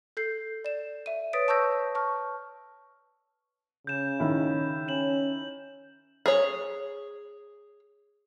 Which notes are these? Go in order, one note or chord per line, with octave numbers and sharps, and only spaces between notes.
A4 G6 C7
D5 E7
E5 D#7
B4 C#5 D#6 A6 B6 D7
A5 C#6 E6 G6 A#6
A5 C#6 F6
C#3 G6 E7
D#3 E4
C#4 E7 F#7
G#4 C#5